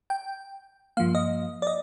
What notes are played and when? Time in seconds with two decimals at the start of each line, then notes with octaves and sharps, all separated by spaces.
0.10 G5
0.97 G2 F3 A#3 F5
1.15 D#5
1.62 D5
1.67 D#5